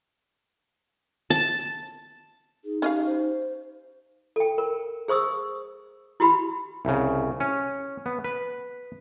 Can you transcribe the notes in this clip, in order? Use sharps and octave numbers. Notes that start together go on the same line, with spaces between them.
A5
D#4 G#4
C#4 G4 D#5 F5
C5
A4 G5
A#4
G#4 C5 C#6 D#6 E6
E4 F#4 G4 B5
C2 C#3
C#4
B3
B4